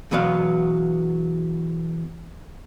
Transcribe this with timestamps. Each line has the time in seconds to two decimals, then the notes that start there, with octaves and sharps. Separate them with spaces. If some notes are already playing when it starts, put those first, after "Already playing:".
0.11 E2 B2 F#3 B3 F5